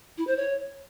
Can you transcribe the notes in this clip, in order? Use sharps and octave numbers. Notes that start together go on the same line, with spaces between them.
E4
C5
C#5